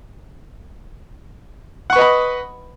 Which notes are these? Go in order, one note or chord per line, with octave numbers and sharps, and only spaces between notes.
B4 D#5 F#5 B5 C#6